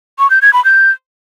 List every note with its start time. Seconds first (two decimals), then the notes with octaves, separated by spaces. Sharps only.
0.19 C#6
0.30 G6
0.42 G#6
0.53 B5
0.65 G6